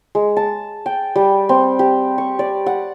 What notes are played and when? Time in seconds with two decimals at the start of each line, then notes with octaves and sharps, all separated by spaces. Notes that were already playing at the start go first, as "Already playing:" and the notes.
0.15 G#3
0.37 A5
0.86 G5
1.16 G3
1.49 C4
1.79 G4
2.18 C#6
2.39 D5
2.66 F#5